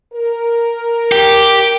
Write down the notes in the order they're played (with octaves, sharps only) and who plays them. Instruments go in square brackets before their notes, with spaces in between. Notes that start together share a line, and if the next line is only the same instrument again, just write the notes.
[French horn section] A#4
[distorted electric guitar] G4